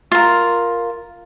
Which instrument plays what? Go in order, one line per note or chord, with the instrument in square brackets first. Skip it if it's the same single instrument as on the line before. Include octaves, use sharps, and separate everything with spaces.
[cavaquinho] F4 A#4